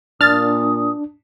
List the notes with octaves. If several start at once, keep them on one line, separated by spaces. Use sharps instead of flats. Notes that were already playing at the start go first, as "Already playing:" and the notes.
A#2 D4 D#6 F6 A6